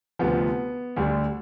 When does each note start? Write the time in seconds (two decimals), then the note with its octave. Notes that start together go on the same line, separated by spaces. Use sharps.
0.19 D2 C3 F3 B3
0.97 D2 D3 G3